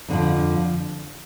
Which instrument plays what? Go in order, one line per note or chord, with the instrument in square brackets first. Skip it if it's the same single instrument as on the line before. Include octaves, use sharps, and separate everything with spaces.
[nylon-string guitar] F2 D3 F3